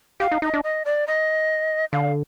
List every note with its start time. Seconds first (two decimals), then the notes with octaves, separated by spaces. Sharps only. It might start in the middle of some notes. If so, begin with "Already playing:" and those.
0.20 G4 F5
0.32 D#4
0.42 D#4 D#5
0.54 D4
0.64 D#5
0.85 D5
1.07 D#5
1.92 D3 F5